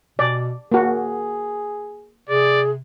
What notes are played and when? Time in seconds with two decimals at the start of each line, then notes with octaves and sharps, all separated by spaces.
0.19 B2 D5
0.72 A#3 F#4 G#4
2.29 C3 G#4 D5